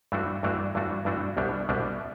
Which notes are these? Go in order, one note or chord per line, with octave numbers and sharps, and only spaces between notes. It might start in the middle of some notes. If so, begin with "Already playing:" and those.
G2 E3 A3 D4 F#4
G2 E3 A3 D4 F#4
G2 E3 A3 D4 F#4
G2 E3 A3 D4 F#4
C2 B2 G3 B3 D4
C2 B2 G3 B3 D4